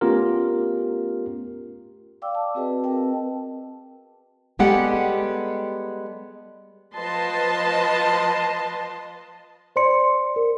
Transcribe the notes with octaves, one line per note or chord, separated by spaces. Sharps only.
A3 B3 C#4 F4 G4 A#4
D5 F5 G5 D6 E6
A5
C4 F#4 G#4 B4 D#5 A5
C4 A#4 B4 D#5 G5 A5
G3 G#3 B3 G4 A4 F#5
F3 B4 D#5 A5 C6
C5 D5 C6 C#7
A#4